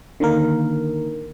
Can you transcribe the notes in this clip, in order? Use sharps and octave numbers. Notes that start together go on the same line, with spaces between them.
D3 D#3 A#3 A#4